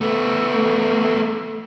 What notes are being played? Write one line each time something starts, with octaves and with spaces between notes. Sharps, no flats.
A3 B3